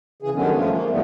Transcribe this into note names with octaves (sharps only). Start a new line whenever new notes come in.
C#3 E3 G#4
G2 D3 D#3 F#3 B3 C#4
F3 G#3 A3 F4
A#3
G#2 E3 F3 G3 A3 B3